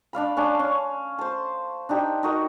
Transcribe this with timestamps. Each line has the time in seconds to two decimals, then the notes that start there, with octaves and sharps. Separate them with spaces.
0.13 D4 D5 F5 B5
0.37 C#4 D4 A5 C6
0.59 C#4
1.19 C5 A5
1.89 D4 D#4 G4
2.23 D#4 F#4 A#4